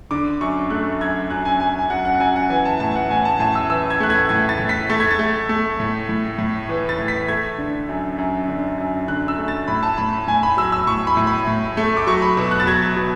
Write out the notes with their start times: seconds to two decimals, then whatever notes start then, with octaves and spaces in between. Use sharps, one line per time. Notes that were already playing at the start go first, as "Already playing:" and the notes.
0.11 D3 D6
0.41 F#2 C#6
0.70 A3 F#6
1.01 F#2 G#6
1.30 F#2 F#6
1.45 G#5
1.60 F#2 G#5
1.79 G#5
1.90 F#2 F#5
2.05 F#5
2.20 F#2 G#5
2.36 F#5
2.50 E3 G#5
2.65 A5
2.80 A2 A5
2.95 F#5
3.10 A2 G#5
3.25 A5
3.40 A2 A5
3.55 E6
3.70 E3 E6
3.90 G#6
4.00 A3 F#6
4.10 G#6
4.29 A2 G#6
4.49 A6
4.59 A2
4.69 B6
4.90 A3 A6
5.00 G#6
5.11 A6
5.19 A3
5.49 A3
5.80 A2
6.09 A2
6.38 A2
6.69 E3
6.89 A6
6.98 A2
7.08 B6
7.28 A3 G#6
7.58 D3
7.89 F#2
8.18 F#2
8.48 D3
8.78 F#2
9.08 D3 F#6
9.28 E6
9.38 A3
9.48 A6
9.68 A2 B5
9.83 A5
9.98 A2 B5
10.13 B5
10.27 A2 G#5
10.43 B5
10.57 F#3 E6
10.72 E6
10.87 A2 C#6
11.07 B5
11.17 A2
11.27 B5
11.47 A2
11.77 A3
11.97 D6
12.07 F#3 C#6
12.22 B5
12.37 B2
12.51 F#6
12.60 A6
12.67 F#3 G#6
12.96 B2